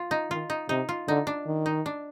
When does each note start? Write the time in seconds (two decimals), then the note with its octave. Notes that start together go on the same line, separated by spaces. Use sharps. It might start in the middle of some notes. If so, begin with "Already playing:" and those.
Already playing: F4
0.11 D#4
0.30 D#3 F4
0.50 D#4
0.69 C3 D#4
0.89 F4
1.08 D3 D#4
1.27 D4
1.46 D#3
1.66 D#4
1.86 D4